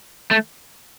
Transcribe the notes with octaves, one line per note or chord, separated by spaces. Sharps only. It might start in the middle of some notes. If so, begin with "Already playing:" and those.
A3